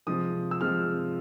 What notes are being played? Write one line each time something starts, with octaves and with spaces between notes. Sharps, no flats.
C3 F3 G#3 D#6
E6
C3 F3 G#3 F6